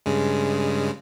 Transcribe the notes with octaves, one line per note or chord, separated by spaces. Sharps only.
G2 C#3 G#3